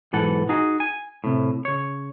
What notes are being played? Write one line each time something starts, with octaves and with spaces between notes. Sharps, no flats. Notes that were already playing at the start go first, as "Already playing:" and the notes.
B1 G#2 E3 A4 F#5
D#4 F#4 G#4
G#5
A2 C3
C#3 C#5